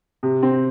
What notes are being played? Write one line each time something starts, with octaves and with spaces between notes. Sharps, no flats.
C3
C4